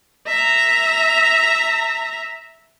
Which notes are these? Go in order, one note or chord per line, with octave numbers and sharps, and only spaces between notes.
E5 A#5